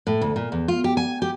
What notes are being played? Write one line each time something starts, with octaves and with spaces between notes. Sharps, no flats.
A2
D2
A#2
E2
F4
G4
G#5
G4